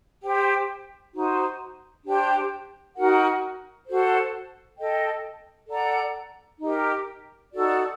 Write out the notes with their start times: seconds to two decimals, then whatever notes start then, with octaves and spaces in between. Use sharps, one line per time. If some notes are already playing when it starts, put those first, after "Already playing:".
0.22 G4 C5 G5
1.13 D#4 F#4 C5
2.04 D4 G4 C5 G5
2.96 D#4 F#4 A#4 F#5
3.86 F#4 A4 C5
4.77 A4 D#5 G5
5.68 A4 D5 F#5 A#5
6.59 D#4 G4 A#4
7.51 D#4 F#4 A4 D5